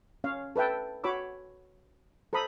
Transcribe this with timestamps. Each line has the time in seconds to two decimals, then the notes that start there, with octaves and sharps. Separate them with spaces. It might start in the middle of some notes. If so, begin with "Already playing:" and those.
0.24 C#4 C#5 F5
0.56 A4 B4 E5 G5 A5
1.04 F#4 C#5 B5 D6 E6
2.33 A4 C5 A#5 B5 D#6